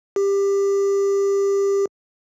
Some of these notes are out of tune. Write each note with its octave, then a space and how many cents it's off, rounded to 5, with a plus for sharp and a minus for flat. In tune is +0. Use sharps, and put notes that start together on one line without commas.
G4 +20